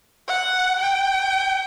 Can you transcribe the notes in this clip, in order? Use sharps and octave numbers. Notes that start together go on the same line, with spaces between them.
F#5
G5